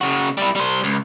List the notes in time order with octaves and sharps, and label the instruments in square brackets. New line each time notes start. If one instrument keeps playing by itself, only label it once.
[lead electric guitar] C#3 F#4
G3 E4
G3 C5
C#2